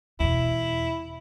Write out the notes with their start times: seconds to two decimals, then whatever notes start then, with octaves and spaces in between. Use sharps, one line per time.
0.20 E2 B2 E4